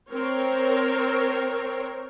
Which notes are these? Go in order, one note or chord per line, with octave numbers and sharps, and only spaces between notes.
C4 A#4 C#5